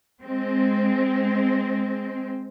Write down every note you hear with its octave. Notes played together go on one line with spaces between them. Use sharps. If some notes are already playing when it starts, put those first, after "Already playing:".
G#3 C4